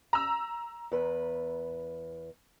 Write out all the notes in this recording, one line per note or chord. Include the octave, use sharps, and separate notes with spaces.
A#5 E6
E2 B4